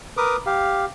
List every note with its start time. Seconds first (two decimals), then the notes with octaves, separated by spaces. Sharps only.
0.17 A#4 B4 D6 D#6
0.46 G4 F5